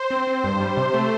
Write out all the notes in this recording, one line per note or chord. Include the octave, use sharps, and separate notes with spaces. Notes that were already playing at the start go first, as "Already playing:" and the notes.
Already playing: C5
C4
C4
G2
G3
C3
A3